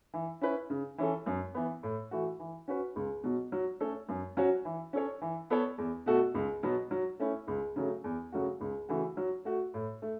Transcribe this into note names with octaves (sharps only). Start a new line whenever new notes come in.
E3
C#4 E4 B4
C#3
E3 C#4 A4
F#2
E3 B3
A2
E3 A3 F#4
E3
C#4 F#4 B4
C#2
B2 F#3
F#3
A3 C#4 A4 C#5
F#2
F#3 C#4 F#4 C#5
E3
C#4 A4 C#5
E3
B3 A4 C#5
E2
B2 A3 F#4 A4
C#2
B2 F#3 B3
F#3
A3 C#4 E4
C#2
C#3 F#3 A3
E2
C#3 F#3 A3 F#4
C#2
C#3 E3 A3 F#4
F#3
A3 F#4
A2
A3